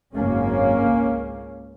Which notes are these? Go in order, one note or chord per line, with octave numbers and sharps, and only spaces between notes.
G#1 F#2 C#3 A#3 C#4
C#2 C#3